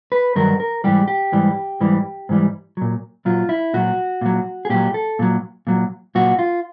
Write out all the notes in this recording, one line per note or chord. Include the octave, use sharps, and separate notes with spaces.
B4
G2 D#3 F#3 A#4
A#4
G#2 E3 G3 G4
G4
G#2 E3 G3
G#2 E3 G3
G#2 E3 G3
A#2 F#3
A#2 F#3 F4
E4
A#2 F#3 F#4
A#2 F#3
G#4
A#2 F#3 G4
A4
A#2 F#3
A#2 F#3
A#2 F#3 F#4
F4